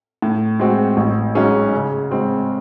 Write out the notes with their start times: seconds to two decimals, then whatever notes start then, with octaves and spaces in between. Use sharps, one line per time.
0.22 A2
0.60 G#3 C4 F#4
0.97 A1
1.35 G#2 F#3 C#4 G#4
1.74 C#3
2.10 G#3 C4 F#4